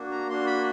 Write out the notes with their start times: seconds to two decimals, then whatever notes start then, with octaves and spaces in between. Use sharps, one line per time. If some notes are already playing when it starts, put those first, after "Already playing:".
Already playing: A#3 D4 F#4
0.11 A#5
0.29 A#3 D4 F#4 C6
0.47 B5